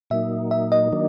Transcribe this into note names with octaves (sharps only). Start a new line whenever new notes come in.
A#2 F#3 A#3 D#4 E5
E5
D#5
D#3 F#3 A#3 D4